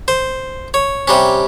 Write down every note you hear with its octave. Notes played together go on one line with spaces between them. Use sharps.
C5
C#5
C3 G3 C#4